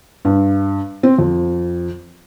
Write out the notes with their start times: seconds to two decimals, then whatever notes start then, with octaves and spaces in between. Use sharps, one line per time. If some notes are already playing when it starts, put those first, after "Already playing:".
0.25 G2
1.03 C4
1.19 F2